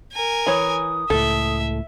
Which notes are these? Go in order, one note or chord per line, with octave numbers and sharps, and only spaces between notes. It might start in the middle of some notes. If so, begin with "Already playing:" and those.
A#4 G#5
E3 C#5 D#6
C#2 A2 A4 E5